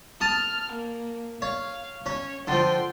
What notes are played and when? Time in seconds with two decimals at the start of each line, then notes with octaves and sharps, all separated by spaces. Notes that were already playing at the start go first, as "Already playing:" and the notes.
0.21 A5 D#6 F6
0.72 A#3
1.42 C#5 F5
2.06 C#4 C#5
2.48 D3 F3 G5 C6